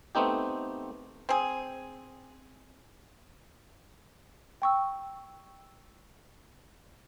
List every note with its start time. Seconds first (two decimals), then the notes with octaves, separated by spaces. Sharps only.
0.15 A3 B3 C4 D#4 G4
1.29 C4 G#4
4.62 G5 C#6 E6